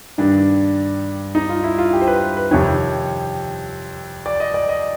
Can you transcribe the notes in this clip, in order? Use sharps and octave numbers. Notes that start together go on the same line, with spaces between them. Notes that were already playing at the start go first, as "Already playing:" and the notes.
G2 D#3 D4
D#4
F4
E4
F4
G4
C5
B4
B4
F2 C3 D#3 C#5
D5
D#5
D5
D#5